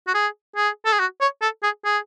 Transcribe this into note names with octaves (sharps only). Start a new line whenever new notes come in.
F#4
G#4
G#4
A4
G#4
F#4
C#5
A4
G#4
G#4